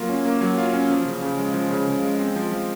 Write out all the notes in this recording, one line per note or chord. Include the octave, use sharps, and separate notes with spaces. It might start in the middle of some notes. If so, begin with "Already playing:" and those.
Already playing: F#3 A#3 F4
C#4
A#3
F#3
F4
C#4
F3
C#3
C#3
G#3
F3
C#3
C#3
G#3
C4
F3
F3